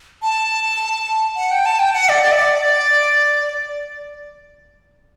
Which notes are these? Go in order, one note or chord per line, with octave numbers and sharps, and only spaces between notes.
A5
F#5
G5
A5
G5
F#5
D5
D5
E5
D5